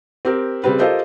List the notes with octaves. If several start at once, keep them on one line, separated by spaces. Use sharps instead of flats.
C4 G4 A#4
C#3 G3 C4 B4
F4 G4 A4 A#4 C5 D#5